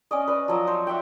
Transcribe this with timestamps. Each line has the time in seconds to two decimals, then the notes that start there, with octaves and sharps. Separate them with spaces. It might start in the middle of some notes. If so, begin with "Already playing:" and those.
0.11 C#4 D5 D#5
0.28 B4 D5
0.48 F3 F#3 D#5
0.67 C5 C#5
0.87 D5 E5 F#5 G5